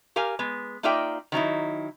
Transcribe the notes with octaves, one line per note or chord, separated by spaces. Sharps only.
G4 A#4 F5 G#5
G#3 B3
A#3 D#4 F4 D5 E5 G5
D#3 F#3 D#4 E4